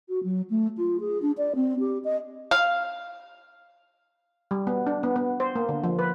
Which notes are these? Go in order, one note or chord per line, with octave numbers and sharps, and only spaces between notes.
F#4
F#3
A3
F4
G#4
D4
D5
C4
G4
D#5
F5
G3
B3
D4
B3
B3
C5
A#3
D3
F3
B4